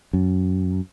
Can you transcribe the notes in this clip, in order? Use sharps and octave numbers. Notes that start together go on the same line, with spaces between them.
F#2